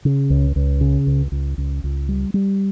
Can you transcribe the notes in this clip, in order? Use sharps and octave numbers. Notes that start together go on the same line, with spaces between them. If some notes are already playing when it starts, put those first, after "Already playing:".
C#3
C#2
C#2
C#3
C#2
C#2
C#2
C#2
G3
G3